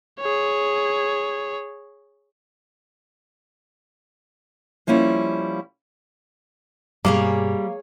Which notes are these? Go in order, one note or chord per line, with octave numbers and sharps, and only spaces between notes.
G#4 C#5
F3 G3 A#3 C#4 E4
G2 B2 G3 A#3 G#4 C#5 F5